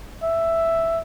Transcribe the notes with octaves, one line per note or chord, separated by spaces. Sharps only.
E5